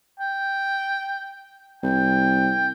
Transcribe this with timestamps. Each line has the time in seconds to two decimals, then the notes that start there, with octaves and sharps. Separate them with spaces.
0.20 G5
1.83 C2 G5